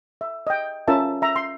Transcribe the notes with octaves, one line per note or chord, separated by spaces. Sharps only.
E5
D#5 G5
C#4 F4 A#4 E5 A5
E5 A#5
C6